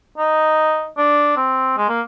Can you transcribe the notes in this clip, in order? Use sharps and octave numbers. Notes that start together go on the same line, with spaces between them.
D#4
D4
C4
G#3
A#3